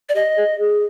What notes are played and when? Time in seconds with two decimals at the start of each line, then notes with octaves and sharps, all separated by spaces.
0.09 D5
0.14 G4 D#5
0.37 G#4
0.58 G#4